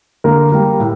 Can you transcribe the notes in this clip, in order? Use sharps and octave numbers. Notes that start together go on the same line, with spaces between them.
D3 A#3 A#4
G3 A#3
A2